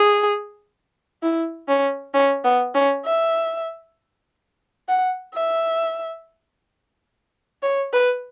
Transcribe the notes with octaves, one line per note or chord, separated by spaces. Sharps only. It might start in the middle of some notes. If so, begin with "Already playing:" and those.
Already playing: G#4
E4
C#4
C#4
B3
C#4
E5
F#5
E5
C#5
B4